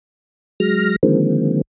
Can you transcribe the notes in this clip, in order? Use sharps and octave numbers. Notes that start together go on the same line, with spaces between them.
F#3 G#3 F6 A#6
D3 D#3 F3 G#3 A#3 C4